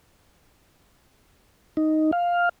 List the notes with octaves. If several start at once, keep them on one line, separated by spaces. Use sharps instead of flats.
D#4
F5